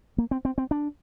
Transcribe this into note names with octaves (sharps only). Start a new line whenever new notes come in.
A#3
C4
C4
C4
D4